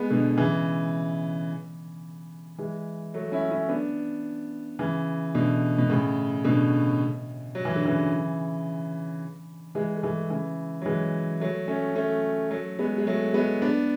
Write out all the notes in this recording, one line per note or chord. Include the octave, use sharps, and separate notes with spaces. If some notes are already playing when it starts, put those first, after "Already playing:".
Already playing: G#3 B3
B2 D3
C#3 E3
E3 G#3
F#3 A3
C#4 E4
C#4 E4
B3 D4
C#3 E3
B2 D3
B2
A2 C#3
B2 D3
F#3
E3
D3
C#3 E3
E3 G#3
A3
E3 G#3
C#3 E3
F#3
E3 G#3
F#3 A3
A3 C#4
A3 C#4
F#3 A3
G#3 B3
G#3
F#3 A3
G#3 B3
B3 D4